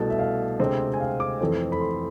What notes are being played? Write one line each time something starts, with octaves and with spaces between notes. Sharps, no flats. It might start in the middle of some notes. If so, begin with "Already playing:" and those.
Already playing: C2 B2 A3 A5
E5
F5
D2 C3 G#3 C4
G#5
F5
D6
F2 E3 A3 C4
B5
C6